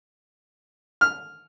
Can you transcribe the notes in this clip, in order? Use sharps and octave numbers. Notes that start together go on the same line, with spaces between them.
F6